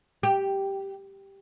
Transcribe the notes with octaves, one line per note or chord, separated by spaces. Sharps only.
G4